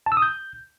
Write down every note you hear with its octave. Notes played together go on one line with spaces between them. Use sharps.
A5
E6
D#6
G6